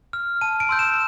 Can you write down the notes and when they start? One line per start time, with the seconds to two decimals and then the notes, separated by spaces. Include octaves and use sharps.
0.13 F6
0.41 A5 D#7
0.60 D7
0.69 C6 E6 G6
0.79 E7